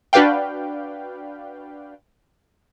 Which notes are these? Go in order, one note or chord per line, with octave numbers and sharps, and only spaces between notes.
D4 F#4 B4 D5 F5 G5